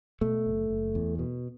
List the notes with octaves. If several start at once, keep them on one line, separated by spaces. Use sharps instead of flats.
B2 A3
F#1
F#1
E2
B2